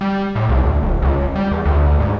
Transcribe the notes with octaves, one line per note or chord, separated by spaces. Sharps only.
G3
A2
C2
D2
D#1
C#2
G3
E2
D2
G#2